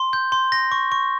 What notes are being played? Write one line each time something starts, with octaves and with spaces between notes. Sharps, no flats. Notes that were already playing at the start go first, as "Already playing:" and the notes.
Already playing: C6
G6
C6
A#6
C#6
C#6